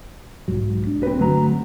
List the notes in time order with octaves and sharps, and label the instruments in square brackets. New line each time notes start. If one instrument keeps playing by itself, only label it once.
[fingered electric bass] B1 G#2 F#3
D4
[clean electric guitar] C4 B4
[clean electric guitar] G2 F#3 A#5 [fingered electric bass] D3 A3